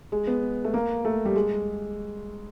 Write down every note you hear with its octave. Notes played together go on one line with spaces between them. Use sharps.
G#3
B3
A3
A#3
A3
G3
G#3